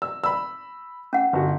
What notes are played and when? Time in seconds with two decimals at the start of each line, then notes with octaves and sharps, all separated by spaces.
0.02 E6
0.24 B5 E6
1.13 C#4 F#5
1.33 G1 F#4